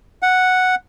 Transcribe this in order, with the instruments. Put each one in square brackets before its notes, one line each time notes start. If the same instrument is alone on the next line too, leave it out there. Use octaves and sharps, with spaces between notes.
[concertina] F#5